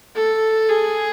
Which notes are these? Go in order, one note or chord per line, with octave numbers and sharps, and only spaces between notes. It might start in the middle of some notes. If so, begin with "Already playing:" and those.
A4
G#4